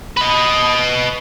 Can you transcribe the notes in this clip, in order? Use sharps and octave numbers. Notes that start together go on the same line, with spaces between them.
B4 D#5